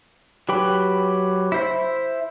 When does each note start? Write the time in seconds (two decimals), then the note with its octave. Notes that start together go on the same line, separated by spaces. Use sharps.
0.49 F#3 G4 B4 G5 B5
1.52 E4 C5 E5